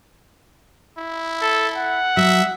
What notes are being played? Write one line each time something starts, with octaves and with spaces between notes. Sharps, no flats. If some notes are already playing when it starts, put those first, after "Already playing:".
E4
A4
F#5
F#3 E5